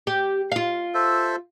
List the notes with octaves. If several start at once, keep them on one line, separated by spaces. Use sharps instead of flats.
G4
F4 F5
A4 C5 E5